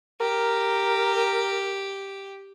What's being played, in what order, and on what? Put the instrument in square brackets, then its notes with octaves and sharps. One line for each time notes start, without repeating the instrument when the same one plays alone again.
[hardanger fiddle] G4 [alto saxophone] A#4